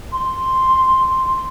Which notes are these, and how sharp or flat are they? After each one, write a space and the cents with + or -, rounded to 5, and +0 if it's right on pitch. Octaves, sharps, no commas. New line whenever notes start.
C6 +0